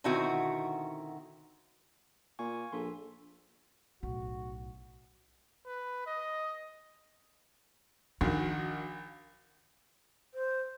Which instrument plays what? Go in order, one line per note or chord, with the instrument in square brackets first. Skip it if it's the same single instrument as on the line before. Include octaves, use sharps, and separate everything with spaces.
[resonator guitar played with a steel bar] B2 D3 D#3 C4 E4 F#4
[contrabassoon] A#2 [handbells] F5 G#5 C#6
[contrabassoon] A#1 [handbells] A4 C6
[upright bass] B1 A2 [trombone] F#4
[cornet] B4
D#5
[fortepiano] A#1 [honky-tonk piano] D#3 F#4 [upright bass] D4
[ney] C5